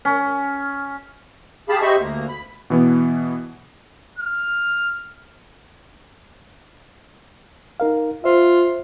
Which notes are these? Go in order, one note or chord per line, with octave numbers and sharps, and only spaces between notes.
C#4
G4 G#4 F5 A5 B5
G4 C5 D#5 E5 B5 C#6
D2 A#3
B5
B2 E3 B3
F6
D#4 A#4 F5
F4 C5 E5